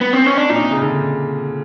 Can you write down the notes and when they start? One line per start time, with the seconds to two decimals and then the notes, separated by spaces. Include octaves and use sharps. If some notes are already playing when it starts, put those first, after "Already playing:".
0.01 B3
0.13 C4
0.26 C#4
0.37 D4
0.50 A#2 D#4
0.60 C3
0.71 C#3
0.82 D3